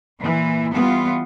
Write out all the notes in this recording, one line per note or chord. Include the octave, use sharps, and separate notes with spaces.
A#2 E3
E3 G3 B3 F4